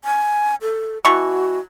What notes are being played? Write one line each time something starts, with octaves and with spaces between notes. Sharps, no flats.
G#5
A4
B2 E3 F#4 C#6